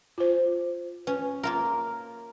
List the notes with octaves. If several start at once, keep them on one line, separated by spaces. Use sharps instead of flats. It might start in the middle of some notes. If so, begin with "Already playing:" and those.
F4 C5
C#4 B4
A#3 F4 A#4